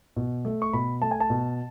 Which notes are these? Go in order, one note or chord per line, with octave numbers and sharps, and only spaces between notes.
B2
A3
C#6
B2 B5
A3 A5
G#5
A5
B2